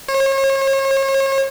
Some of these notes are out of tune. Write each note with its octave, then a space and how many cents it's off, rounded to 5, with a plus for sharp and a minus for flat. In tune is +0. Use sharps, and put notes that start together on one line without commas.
C#5 -40